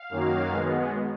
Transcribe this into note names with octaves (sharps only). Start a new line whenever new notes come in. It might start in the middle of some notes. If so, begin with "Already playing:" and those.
Already playing: F5
F#2 D#3 F#3 A#3
B2 G#3 B3